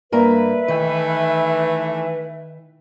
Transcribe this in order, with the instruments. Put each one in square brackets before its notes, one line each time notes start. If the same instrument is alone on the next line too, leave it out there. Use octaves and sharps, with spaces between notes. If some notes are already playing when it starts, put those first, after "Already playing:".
[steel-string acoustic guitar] G2 A#3 A#5 [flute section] B4 E5
[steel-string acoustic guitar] D#3 [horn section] E3 A3